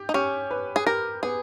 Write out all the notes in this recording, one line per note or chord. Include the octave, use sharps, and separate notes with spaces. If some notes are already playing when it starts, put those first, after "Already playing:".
Already playing: G4
D#4
C#4 G4
B4
G#4
G4 A#4
B3 G#4